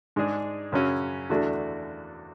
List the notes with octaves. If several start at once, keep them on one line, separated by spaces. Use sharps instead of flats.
G#2 G#3 D4 G#4
F#2 C#3 F#3 C#4 F#4
E2 D3 A3 D4 F#4